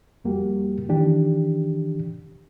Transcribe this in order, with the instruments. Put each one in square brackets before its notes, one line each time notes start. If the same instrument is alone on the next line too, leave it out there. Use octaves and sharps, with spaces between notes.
[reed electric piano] F2 G3 A#3 F#4 G4
D#3 E3 D4 G4